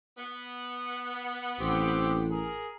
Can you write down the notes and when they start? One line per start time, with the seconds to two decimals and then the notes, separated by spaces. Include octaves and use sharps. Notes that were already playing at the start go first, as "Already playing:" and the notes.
0.18 B3
1.59 A1 C4 G4
2.30 G#4 A#4